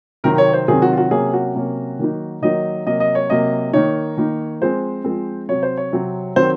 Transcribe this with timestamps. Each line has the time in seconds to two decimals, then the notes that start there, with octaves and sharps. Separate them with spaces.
0.24 C3 D#3 F#3 C4 A#4
0.38 C#5
0.53 C5
0.68 C3 D#3 F#3 C4 G#4
0.82 F#4
0.93 F4
0.97 F#4
1.11 C3 F#3 A#3 C#4 G#4
1.33 F#4
1.55 C3 F#3 A#3 C#4
1.99 D#3 F#3 A#3 D#4
2.42 D#3 F#3 A#3 D#4 D#5
2.86 C3 F#3 A#3 D#5
3.00 D#5
3.15 C#5
3.30 C3 F#3 A#3 D#5
3.73 D#3 A#3 D#4 C#5
4.17 D#3 A#3 D#4
4.61 F3 G#3 C4 C5
5.04 F3 G#3 C4
5.49 C3 F#3 C4 C#5
5.63 C5
5.78 C#5
5.92 C3 F#3 C4
6.36 D#3 F#3 C4 C5